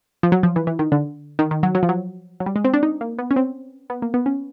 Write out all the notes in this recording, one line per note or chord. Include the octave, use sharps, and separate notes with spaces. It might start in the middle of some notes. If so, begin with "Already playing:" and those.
F3
F#3
F3
E3
E3
D#3
D3
D#3
D#3
F#3
F#3
F3
F#3
F#3
G3
G#3
C4
D4
D#4
A#3
B3
C#4
C4
B3
A#3
B3
C#4